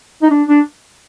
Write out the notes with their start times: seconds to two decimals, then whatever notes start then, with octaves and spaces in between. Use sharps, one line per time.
0.22 D#4
0.30 D4
0.48 D4